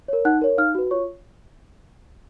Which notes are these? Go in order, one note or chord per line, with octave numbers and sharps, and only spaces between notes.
A#4 C#5
D#4 F#5 F#6
A#4 C#5
D#4 F5 F6
F#4 B4
F4 C#5 C#6